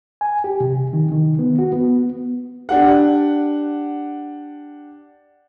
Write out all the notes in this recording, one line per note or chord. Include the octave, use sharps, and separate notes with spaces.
G#5
G4
C3
D#3
D#3
B3
F#4
B3
D4 G4 F#5